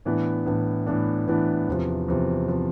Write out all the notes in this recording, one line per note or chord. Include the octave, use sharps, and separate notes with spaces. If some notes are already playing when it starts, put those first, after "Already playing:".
A2 E3 B3 D4
A2 E3 B3 D4
A2 E3 B3 D4
A2 E3 B3 D4
E2 C3 F3
E2 C3 F3
C3 F3